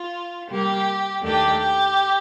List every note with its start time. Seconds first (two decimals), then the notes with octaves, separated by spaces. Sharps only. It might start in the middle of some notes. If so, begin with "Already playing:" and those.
Already playing: F4
0.49 C3 G3 A#3 G4
1.22 D#2 D#3 A3 D4 G4
1.59 G4